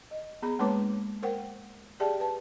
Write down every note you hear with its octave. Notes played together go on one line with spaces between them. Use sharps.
D#5
B3 G#4 B5
G#3 A#3 D4 B4 C#5 D6
A#4 C5 F#5 G5
G4 G#4 D5 E5 G5 A5
B4 A5